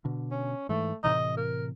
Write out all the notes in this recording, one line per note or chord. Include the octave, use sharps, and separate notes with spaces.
B2 D3
C#4
G#2 E3 A3
A2 C3 E3 D#5
A#4